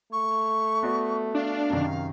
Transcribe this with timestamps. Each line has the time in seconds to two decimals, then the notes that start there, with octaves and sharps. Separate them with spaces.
0.12 A3 C#6
0.83 B3 F#4 D5
1.35 D4 F5
1.70 F#2 C3 D#3